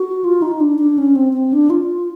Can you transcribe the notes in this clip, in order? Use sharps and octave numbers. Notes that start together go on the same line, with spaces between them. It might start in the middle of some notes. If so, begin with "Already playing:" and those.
Already playing: F#4
F4
D#4
D4
D4
C#4
C4
C4
D4
F4